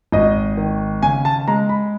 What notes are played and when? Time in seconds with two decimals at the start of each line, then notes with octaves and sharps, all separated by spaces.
0.12 G#1 D#5
0.57 D#3
1.02 C#3 G#5
1.25 A5
1.47 G#3 A#5
1.69 B5